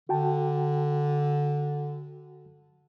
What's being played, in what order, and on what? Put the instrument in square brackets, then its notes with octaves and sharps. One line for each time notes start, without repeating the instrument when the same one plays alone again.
[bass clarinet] D3 [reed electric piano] F#4 G5 A5